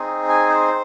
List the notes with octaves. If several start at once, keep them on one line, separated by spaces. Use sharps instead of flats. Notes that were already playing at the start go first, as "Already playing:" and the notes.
Already playing: C4 D#4 G#4
G#5
C5